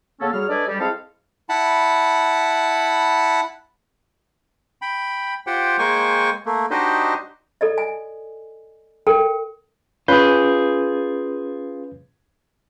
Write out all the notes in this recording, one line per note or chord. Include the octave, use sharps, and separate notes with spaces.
C#3 A#3 B3 C#4 A4
F#3 G3 G#4 F6
D4 A4 B4 D5 D#5 G#5
G3
C4 E4 G#4 A4 D#5 F5
E4 F#5 A5 B5
G5 B5
F4 G4 C5 F#5 G5
G#3 A#3 C5 G5 G#5 C#6
A3 A#3
D4 D#4 F#4 G4 C5 D#5
A4 D5 D#5
G#5
A4 A#4 G5
C#4 F4 G#4 B4 G6